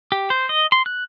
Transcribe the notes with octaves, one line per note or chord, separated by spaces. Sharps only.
G4
C5
D#5
C6
F#6